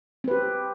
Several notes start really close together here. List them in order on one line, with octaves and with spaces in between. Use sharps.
C4 B4 G4